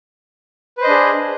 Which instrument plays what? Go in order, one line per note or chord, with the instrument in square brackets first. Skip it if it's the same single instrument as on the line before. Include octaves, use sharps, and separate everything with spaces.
[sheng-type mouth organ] B4
C5
D#5
D4
G#4